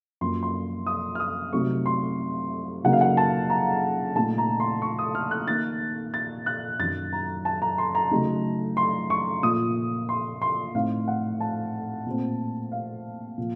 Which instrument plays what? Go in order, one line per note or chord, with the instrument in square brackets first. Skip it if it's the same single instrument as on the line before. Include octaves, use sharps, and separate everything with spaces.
[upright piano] F#2 F3 A#3 C6
C6
D#6
F6
D#6
C3 F#3 A3 D#4 C#6
C6
C#3 F#3 A#3 D#4 F#5
F5
F#5
A5
A#5
A#2 A3 D#4 A5
A#5
C6
C#6
D#6
F6
F#6
D#3 A#3 D#4 A6
A6
F#6
F#2 D#3 F#3 A6
A#5
A5
A#5
C6
A#5
C#3 F#3 A3 D#4
C6
C#6
A#2 F3 A#3 D#6
C6
C6
A2 A3 C4 D#4 F5
F#5
A5
A#2 A3 C4
F5
A#2 F3